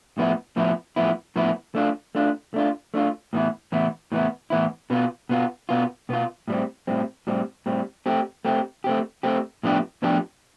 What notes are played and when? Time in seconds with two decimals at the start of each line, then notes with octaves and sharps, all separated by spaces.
0.18 A2 F3 B3 E4
0.56 A2 F3 B3 E4
0.96 A2 F3 B3 E4
1.36 A2 F3 B3 E4
1.75 A3 D4 F4
2.15 A3 D4 F4
2.54 A3 D4 F4
2.94 A3 D4 F4
3.33 A2 E3 B3 E4
3.72 A2 E3 B3 E4
4.12 A2 E3 B3 E4
4.50 A2 E3 B3 E4
4.90 B2 B3 F4
5.29 B2 B3 F4
5.69 B2 B3 F4
6.09 B2 B3 F4
6.48 A2 G3 C4
6.87 A2 G3 C4
7.27 A2 G3 C4
7.66 A2 G3 C4
8.06 A3 C4 G4
8.45 A3 C4 G4
8.84 A3 C4 G4
9.23 A3 C4 G4
9.63 A2 F3 B3 D4 G4
10.02 A2 F3 B3 D4 G4